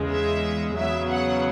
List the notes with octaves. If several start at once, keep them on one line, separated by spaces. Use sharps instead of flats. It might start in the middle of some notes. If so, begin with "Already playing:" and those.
Already playing: E2 C#3 G#3
E5
E2 C#3 F#3 B3 E5
F#5